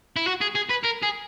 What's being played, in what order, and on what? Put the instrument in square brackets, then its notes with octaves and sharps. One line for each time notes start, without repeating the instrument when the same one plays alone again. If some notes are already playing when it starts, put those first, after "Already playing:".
[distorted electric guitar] E4
F#4
G#4
G#4
B4
A#4
G#4